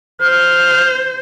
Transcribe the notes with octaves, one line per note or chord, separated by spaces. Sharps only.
C5 F6